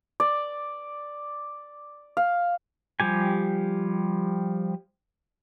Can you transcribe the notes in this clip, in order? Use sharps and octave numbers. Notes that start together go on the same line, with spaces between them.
D5
F5
F3 G3 G4 G#5